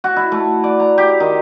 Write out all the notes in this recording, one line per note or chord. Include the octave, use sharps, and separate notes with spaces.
F#4
E4
A3
D5
A#5
G4
D#3